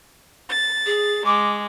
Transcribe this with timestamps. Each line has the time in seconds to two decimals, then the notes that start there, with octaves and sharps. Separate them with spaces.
0.49 A6
0.86 G#4
1.25 G#3 D6